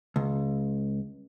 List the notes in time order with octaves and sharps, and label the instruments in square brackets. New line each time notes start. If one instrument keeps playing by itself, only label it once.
[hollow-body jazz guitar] C#2